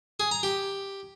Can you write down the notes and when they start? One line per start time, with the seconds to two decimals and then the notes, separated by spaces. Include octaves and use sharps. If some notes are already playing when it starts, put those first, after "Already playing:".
0.20 G#4
0.31 A#5
0.43 G4